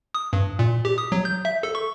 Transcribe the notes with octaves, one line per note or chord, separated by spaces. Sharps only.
D#6
G2
A#2
G4
D#6
F#3
G6
E5
A4
C#6